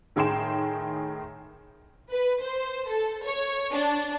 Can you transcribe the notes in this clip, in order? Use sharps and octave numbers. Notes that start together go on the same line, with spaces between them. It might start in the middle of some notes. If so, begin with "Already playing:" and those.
A2 D#3 G#4 G5 C6 E7
B4
C5
A4
C#5
D4